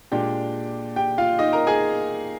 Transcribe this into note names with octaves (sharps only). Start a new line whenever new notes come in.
A#2 G#3 D4 G4 G5
G4 G5
F4 F5
D#4 D#5
A#4 A#5
G#4 G#5